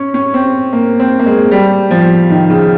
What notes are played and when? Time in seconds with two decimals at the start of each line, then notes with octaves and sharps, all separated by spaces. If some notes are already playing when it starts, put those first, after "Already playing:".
Already playing: C#4
0.14 C#4
0.34 C4
0.73 A#3
1.00 C4
1.19 A#3
1.26 G#3
1.51 G3
1.91 F3
2.30 D#3
2.50 C#3